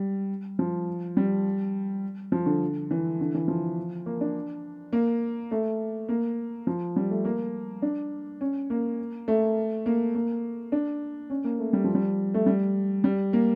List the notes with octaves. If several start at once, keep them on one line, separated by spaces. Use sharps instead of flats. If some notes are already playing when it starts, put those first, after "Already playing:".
Already playing: G3
F3
G3
F3
D3
E3
D3
E3
F3
A#3
D4
A#3
A3
A#3
F3
G3
A3
A#3
D4
C#4
A#3
A3
A#3
A#3
D4
C#4
A#3
A3
G3
F3
G3
A3
G3
G3
A#3